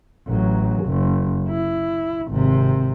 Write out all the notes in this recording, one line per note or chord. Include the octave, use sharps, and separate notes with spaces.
A1 F#3
F#1
E4
G#1 C3